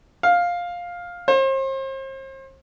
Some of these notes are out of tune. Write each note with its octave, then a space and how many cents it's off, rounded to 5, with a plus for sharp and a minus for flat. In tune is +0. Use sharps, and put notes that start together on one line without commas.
F5 +10
C5 +40